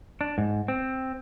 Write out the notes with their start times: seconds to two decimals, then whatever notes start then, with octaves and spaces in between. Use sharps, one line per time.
0.21 D4
0.38 G#2
0.68 C4